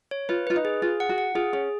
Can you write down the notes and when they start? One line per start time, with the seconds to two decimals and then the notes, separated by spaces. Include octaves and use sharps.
0.11 C#5
0.29 F4 B4
0.47 F4 B4
0.56 D#4
0.65 G#4
0.82 F4 G#4
1.00 F#5
1.09 F#4
1.18 F#5
1.35 F4 G#4
1.53 C#4 G#4